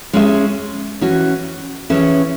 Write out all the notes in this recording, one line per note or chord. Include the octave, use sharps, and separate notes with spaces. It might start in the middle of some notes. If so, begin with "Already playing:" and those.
G#3 C#4 G#4 E5
E3 C#4 F#4
E3 C#4 G#4 C#5 E5